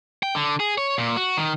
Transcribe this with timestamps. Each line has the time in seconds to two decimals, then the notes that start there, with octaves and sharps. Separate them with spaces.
0.23 G5
0.35 D3
0.60 G#4
0.78 C#5
0.98 A#2
1.16 F#4
1.37 D#3